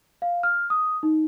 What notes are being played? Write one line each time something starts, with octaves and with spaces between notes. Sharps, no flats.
F5
F6
D#6
D#4